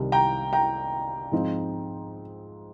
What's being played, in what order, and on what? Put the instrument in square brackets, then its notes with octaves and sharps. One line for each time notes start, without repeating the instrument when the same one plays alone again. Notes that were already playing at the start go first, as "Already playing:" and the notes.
Already playing: [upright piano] C2 C3 D#3 G3 C4
G5 A#5
G5 A#5
G#2 F3 C4 D#4